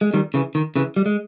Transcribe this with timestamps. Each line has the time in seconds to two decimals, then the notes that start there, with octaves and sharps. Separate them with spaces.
0.01 G#3
0.14 D#3 G3
0.34 C#3 E3
0.55 D#3
0.76 C#3 E3
0.96 G3
1.06 G#3